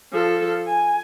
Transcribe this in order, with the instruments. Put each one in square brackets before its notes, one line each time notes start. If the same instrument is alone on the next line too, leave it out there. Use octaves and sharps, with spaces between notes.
[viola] F3 A4
G#5